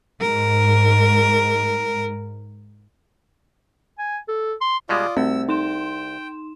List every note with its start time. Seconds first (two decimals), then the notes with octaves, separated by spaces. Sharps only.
0.21 G#2 A#4
3.99 G#5
4.28 A4
4.61 C6
4.89 B2 G3 G#3 F4 D5 D#5
5.17 C2 A3 C4 E5 E6
5.49 D#4 G5 C6 E7